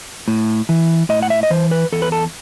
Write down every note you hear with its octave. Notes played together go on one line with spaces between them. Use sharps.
A2
E3
A2 D#5
F#5
E5
D#5
E3 C5
B4
E2 A4
B4
A4